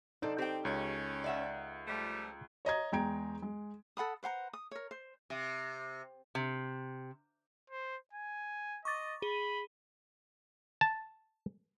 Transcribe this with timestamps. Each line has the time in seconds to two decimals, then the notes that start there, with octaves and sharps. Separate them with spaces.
0.22 D4 D#4 A4 C5 D5
0.38 C4 G4 G5
0.65 C#2 C#4
1.24 D5 E5 F#5
1.88 F3 G3 A3
2.65 C#5 D#5 A#5 G#6
2.92 E2 G#3 G5 A#5 G#6 D7
3.42 G#3
3.97 A4 F#5 B5 D#6
4.23 B4 C5 F#5 A#5
4.53 D#6
4.71 A#4 C#5
4.91 C5
5.30 C3
6.35 C3
7.70 C5
8.13 G#5
8.85 D#5 C#6 D6 A6
9.22 G#4 B5 D#7 G7
10.81 A5